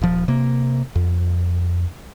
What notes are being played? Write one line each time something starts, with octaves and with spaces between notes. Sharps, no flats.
D#1 F3
C3 A#3
F2